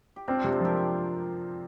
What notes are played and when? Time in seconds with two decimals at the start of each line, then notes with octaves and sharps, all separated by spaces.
0.16 G4
0.28 C4 D4 F4
0.44 C3
0.52 A4 C5
0.61 F3 G4 A#4